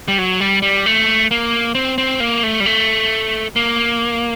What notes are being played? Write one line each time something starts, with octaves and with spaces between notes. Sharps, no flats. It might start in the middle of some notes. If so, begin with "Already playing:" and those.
G3
F#3
G3
G3
A3
A#3
C4
C4
A#3
A3
G3
A3
A#3